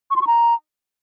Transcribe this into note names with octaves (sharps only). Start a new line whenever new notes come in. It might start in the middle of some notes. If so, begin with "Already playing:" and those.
C#6
C6
C#6
A#5